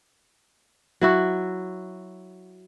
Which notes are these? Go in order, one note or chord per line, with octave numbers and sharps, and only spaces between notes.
F#3 E4 F#4